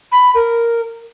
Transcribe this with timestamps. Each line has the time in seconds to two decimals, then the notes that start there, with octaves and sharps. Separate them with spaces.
0.12 B5
0.35 A#4